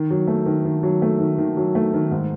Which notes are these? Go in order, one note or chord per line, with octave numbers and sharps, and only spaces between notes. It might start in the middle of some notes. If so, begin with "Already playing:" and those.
Already playing: D#3
F#3
A3
D#3
D#3
F#3
A3
D#3
D#3
F#3
A3
D#3
G#2